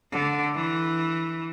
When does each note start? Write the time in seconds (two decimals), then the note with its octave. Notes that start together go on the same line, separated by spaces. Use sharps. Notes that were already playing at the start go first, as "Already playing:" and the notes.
0.12 D3
0.55 E3